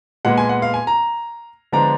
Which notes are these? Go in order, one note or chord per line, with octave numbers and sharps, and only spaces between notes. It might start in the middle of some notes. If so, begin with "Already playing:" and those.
A#2 G#3 B3 F#5
G#5
F#5
F5
G#5
A#5
D3 F3 G#3 B3 D4 A#5